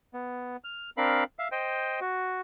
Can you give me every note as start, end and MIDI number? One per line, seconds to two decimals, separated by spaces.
0.14 0.57 59
0.64 0.90 89
0.97 1.24 60
0.97 1.24 62
0.97 1.24 70
0.97 1.24 77
0.97 1.24 83
1.39 1.48 76
1.39 1.48 77
1.52 2.00 72
1.52 2.00 75
1.52 2.00 79
2.01 2.41 66